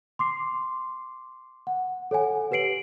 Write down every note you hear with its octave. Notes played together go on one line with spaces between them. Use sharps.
C6 D6 C7
F#5
A4 C#5 F#5 G#5
G4 B4 C#5 C7 D7 F#7